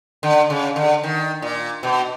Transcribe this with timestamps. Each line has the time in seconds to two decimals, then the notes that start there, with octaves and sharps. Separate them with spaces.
0.23 D3
0.50 C#3
0.76 D3
1.04 D#3
1.42 A#2
1.83 B2